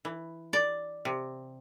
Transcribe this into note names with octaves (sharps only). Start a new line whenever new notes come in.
E3
D5
C3